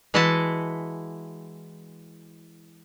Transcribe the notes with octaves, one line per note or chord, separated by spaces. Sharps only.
E3 G#3 E4 F#4 D#5 A5